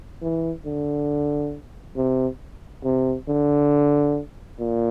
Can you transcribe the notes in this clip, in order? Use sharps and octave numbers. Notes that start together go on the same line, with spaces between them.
E3
D3
C3
C3
D3
A#2